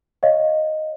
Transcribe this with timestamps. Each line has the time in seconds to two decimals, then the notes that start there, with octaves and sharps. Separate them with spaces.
0.23 C#5 D#5 F5